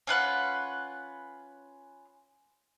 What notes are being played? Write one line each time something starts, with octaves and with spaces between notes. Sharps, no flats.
C#4 F4 B4 F#5